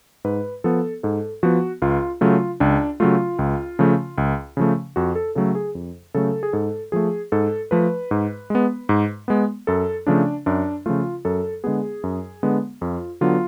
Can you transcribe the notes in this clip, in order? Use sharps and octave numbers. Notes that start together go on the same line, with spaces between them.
G#2 B4
F3 B3 A4
G#2 A4
F3 B3 F#4
C#2 F4
C#3 F#3 A3 F4
C#2 D4
C#3 F#3 A3 F4
C#2
C#3 F3 A3
C#2
C#3 F3 A3
F2 F#4
A4
C#3 F#3 A3 A4
G#4
F2
C#3 F#3 A3 A4
G#4
G#2 A4
F3 A3 G#4
G#2 A4
F3 A3 B4
G#2
G#3 B3
G#2
G#3 B3
F#2 A4
C#3 F3 A3 D4
F#2 D4
C#3 F3 A3 F4
F#2 A4
D3 G#3 B3 G#4
F#2
D3 G#3 B3
F2 F4
D3 F#3 B3 F4